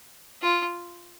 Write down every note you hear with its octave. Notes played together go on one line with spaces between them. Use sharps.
F4